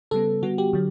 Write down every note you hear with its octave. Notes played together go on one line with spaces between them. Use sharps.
C#3 G3 B3 A4
D3 G3 B3 F#4
G4
D3 F#3